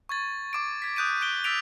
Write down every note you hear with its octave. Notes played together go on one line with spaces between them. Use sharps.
C#6 G#6 A6
C#6 D6 D7
G#6 B6
D#6 F#6 G6 D7 D#7
F#6 D7 G7
E6 A6 B6 D7 F7